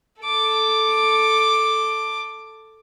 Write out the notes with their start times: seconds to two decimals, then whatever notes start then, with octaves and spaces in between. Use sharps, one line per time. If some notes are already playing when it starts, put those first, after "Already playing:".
0.22 A4 D6